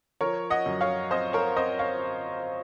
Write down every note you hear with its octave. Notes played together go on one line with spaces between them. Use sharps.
F3 A#4 C#5
D#5 F#5
F#2
C#5 F5
C4 C5 D#5
A#4 C#5
C4 C5 D#5
C#5 F5